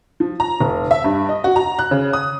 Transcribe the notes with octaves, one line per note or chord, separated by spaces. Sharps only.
F3
A#5
F1
E5
G2
D#5
F#4
A#5
F#6
C#3
D#6